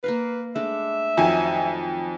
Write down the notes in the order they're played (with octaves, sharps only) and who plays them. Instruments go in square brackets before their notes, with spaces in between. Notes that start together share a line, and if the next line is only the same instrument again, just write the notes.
[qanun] A#3 A#4 F5 [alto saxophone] B4
[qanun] G#3 A3 D4 [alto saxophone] E5
[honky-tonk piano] F2 G#5 [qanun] D#3 F3 F#3